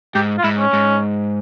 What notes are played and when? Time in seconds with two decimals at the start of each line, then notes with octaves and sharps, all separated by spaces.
0.15 G#2 G4
0.38 F4
0.44 G#2 E4
0.58 C#4
0.73 G#2